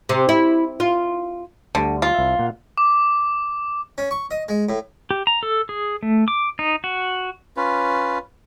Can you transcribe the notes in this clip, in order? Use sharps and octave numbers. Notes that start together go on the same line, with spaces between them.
C3
E4
F4
D2 D3 G3
F4
C2 E5
A#2 F5 F#5
D6
C#4
C#6
D#5
G#3
A2
G4
A#5
A4
G#4
A3
D6
D#4
F#4
C#4 F4 B4